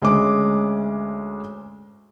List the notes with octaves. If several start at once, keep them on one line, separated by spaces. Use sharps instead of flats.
D2 G#3 C#4 C#5 D6